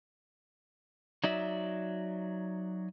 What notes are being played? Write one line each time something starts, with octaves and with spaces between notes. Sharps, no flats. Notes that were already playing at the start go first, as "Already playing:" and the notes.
F#3 D#4 F#4 D5 E5